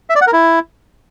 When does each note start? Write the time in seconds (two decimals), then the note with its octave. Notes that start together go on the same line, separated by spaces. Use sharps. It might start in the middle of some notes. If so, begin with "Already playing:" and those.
0.10 E5
0.15 D5
0.21 F#5
0.27 A#4
0.33 E4